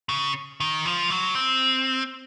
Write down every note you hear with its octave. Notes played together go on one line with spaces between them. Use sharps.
C#3
D#3
F3
F#3
C4